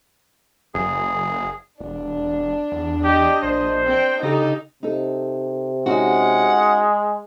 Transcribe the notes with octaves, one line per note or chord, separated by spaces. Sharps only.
F#1 G#4
E1 D4
E2
G4 D#5
A#1 C5
C4 G5
C#3 D#4 G4 A4
C3 D#4 A4
G#3 C#4 D#4 F#4 F#5